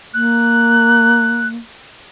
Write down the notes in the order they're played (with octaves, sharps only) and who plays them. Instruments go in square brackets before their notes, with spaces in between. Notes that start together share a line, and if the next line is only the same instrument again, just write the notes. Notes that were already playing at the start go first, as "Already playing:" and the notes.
[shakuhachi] A#3 [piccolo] F#6